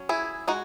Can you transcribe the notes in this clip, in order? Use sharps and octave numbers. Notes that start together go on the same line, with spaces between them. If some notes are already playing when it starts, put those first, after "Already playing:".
Already playing: F#3 C#4
E4 G#4
G#3 D#4 F#4